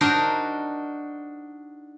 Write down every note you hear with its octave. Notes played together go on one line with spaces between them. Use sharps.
D4 D#4 F#4 A#4 C5